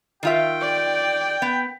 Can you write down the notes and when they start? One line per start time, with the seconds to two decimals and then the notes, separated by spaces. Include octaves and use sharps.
0.23 D#3 F4 E5 G5
0.61 D5
1.42 B3